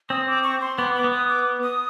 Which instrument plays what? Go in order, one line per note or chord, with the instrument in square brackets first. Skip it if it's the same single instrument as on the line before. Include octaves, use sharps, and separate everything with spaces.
[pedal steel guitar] C4 [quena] D#6
[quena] D6
C#6
C6
[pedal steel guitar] B3 [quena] D6
[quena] D6
[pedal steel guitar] B3
[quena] D#6
D6
D#6